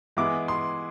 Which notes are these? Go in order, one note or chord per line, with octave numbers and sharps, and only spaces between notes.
E3 G#3 B3 E4 D6
C6